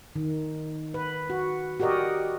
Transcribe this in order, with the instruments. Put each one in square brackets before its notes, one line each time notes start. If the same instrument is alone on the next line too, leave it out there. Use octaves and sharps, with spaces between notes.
[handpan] D#3
B4
F#4
F#4 G4 A#4 D5 D#5